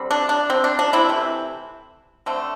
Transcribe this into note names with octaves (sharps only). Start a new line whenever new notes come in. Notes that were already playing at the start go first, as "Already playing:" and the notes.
Already playing: D3 G3 C4
D4
D4
C4
D4
D4
C4 E4
C3 E3 A3 C4
D3 A3 C4